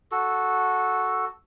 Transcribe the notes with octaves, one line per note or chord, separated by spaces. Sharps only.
F#4 A4